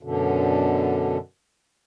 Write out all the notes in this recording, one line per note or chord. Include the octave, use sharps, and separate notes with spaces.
F#2 B2 D3